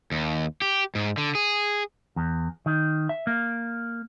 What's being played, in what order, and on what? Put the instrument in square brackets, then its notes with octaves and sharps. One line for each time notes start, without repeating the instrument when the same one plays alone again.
[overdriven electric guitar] D#2
G4
G#2
D3
G#4
[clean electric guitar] E2
D#3
E5
A#3